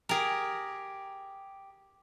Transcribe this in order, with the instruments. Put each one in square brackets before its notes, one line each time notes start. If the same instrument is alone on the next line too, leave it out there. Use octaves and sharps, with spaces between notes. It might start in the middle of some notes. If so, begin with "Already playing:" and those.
[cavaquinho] G4 A#5 [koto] G#4 A#4